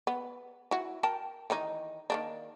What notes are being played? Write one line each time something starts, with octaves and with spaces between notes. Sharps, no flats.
B3
E4 F#4
A#4 G5 A5
D#3 E3 D#4
D#3 A#3 D4